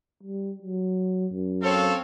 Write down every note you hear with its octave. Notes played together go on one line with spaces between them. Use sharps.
G3
F#3
F#2
C4 A4 C#5 F5